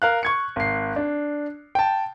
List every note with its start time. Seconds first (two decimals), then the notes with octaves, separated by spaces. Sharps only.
0.02 A#4 F5 F#6
0.23 C#6 G#6 C#7
0.56 G#1 C7
0.96 D4
1.75 G5 A5